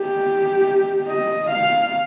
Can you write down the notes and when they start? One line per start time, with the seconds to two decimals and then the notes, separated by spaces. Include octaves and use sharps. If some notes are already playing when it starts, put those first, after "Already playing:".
Already playing: G4
1.08 D#5
1.50 F5